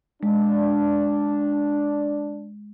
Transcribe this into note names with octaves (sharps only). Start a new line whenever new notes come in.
G#3 D4